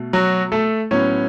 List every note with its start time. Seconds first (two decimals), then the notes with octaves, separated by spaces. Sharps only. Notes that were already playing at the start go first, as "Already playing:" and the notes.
Already playing: B2 A3
0.13 F#3 F#4
0.52 A3 A4
0.91 A2 F#3 B3 C#4 C#5